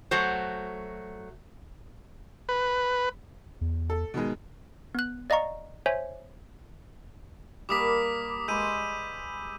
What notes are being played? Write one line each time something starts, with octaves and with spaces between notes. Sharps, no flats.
F#3 A3 F#4 C5
B4
E2
A4
B2 D#3 G#3
B3 F#6
D5 D#5 F5 A#5 C#6
C5 C#5 E5 G#5
G3 A#3 A#4 D6 D#6 B6
G#3 B4 E6 G6 D#7